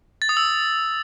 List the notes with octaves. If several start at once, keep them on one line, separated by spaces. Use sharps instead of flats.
A6
D#6
E6